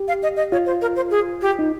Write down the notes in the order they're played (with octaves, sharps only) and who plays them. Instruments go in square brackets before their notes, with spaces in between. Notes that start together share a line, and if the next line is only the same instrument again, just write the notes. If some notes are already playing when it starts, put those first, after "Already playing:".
Already playing: [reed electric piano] G4
[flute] F5
D#5
D#5
[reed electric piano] F4 [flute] C#5
[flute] C5
A#4
C5
G#4
G4
[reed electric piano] D#4